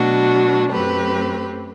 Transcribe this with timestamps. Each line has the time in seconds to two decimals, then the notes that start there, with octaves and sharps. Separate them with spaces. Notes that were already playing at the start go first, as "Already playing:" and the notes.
Already playing: B2 F#3 A3 D4 F#4
0.70 F#2 F#3 A3 C4 G4 B4